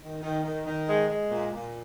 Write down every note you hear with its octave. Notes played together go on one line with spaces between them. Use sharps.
D#3
D#3
D#3
D#3
G#3
G#3
A#2
A#2